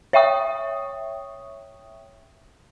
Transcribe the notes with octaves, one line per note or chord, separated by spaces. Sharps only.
C#5 E5 G5 C#6 D#6